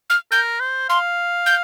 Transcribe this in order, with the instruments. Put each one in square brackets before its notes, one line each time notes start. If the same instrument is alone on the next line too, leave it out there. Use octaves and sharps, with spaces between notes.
[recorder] F6
[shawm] A#4 [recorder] G6
[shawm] C5
[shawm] F5 [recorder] C6
[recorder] G6